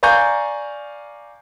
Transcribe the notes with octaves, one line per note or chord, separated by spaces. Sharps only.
D5 F5 G#5 A#5 C#6 G6